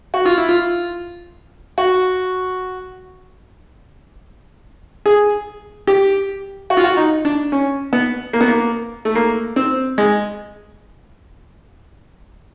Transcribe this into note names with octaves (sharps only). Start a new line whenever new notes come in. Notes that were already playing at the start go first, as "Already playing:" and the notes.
F#4
F4
E4
F4
F#4
G#4
G4
F#4
F4
F#4
D#4
D4
C#4
B3
A#3
B3
A#3
A3
A#3
C4
G#3